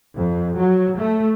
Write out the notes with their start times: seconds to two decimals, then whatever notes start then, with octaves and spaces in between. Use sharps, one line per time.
0.15 F2
0.56 F#3
0.96 A3